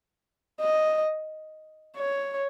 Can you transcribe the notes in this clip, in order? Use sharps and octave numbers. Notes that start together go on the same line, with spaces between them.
D#5
C#5